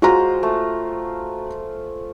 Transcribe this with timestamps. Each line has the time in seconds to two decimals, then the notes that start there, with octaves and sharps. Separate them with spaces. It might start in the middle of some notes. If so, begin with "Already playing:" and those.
0.02 G#3 F4 F#4 C5 A#5
0.43 A3